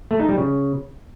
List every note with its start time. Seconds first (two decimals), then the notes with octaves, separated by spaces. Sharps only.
0.11 A3
0.20 D#4
0.29 G3
0.38 C#3